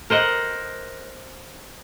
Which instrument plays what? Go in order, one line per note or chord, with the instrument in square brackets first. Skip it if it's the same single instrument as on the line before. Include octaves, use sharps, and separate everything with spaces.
[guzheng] A#4 C5 D#5 F#5